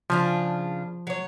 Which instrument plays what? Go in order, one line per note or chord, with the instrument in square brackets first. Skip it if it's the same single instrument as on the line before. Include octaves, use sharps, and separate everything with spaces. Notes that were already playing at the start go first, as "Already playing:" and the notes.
[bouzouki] C#3 D4 F4 [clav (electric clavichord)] F3
[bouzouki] F#3 C#5